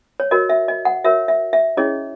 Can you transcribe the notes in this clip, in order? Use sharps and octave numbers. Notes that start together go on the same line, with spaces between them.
C#5
F#4 A#4 C#5 D#5
E5
D#5
F#5
F#4 A#4 C#5 E5
E5
E5
C#4 E4 G#4 C#5 D#5